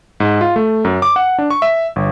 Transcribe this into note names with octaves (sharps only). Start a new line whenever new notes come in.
G#2
F4
A3
F#2
D6
F#5
D4
C#6
E5
G1